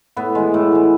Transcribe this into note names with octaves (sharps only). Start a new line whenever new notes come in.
A2 B3
E3 G#3
A2
E3 G#3